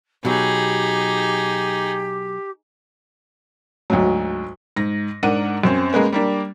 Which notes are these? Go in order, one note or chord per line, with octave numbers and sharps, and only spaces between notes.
B2 F#3 D#4 G4 G#4
D2 G#2 F#3
G#2 A#6
G#2 D4 A#4 F#5 D#7
F#2 C4 C#4
G#3 A#3 B3 C#4
G3 A#3 D4